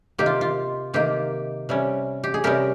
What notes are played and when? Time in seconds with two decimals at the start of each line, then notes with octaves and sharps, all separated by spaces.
0.18 C3 D#3 A#3 G4
0.26 F4
0.41 F4
0.93 C3 D#3 A#3 G4
1.69 C3 G3 C#4
2.24 G4
2.34 G#4
2.44 C3 G3 C#4 G4 A#4